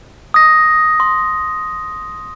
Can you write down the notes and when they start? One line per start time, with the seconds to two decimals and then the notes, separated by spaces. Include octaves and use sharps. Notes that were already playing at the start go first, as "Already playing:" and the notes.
0.34 D#6 A#6
1.00 C6